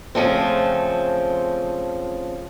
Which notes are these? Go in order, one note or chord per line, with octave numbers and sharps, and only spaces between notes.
C#3 F3 A3 C4